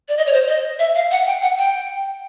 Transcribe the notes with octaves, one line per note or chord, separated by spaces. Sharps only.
D5
D#5
C#5
C5
D#5
E5
F5
F#5
G5
F#5
G5